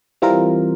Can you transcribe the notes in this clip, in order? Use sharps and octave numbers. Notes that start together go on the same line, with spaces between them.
E3 G3 C4 F4 A#4